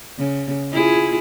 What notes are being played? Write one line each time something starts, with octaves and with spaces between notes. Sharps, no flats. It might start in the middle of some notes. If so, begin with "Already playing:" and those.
C#3
E4 F4 G#4